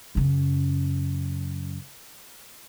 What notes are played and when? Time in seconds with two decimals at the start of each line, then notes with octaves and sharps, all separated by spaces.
0.15 F#2 C#3